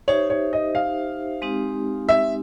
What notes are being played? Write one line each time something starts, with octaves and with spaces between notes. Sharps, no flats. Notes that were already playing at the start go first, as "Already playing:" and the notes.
D#4 G4 C5 C#5 E5
C#5
D#5
F5
G#3 C4 D#4 G4
E5